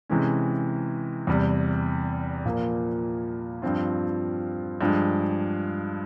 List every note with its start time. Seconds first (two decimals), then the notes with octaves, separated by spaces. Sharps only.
0.10 C3 E3 G#3 C#4
1.27 E2 C3 G3
2.45 A#2 F3 A#3
3.62 G2 F3 C4 F4
4.81 G2 F3 G#3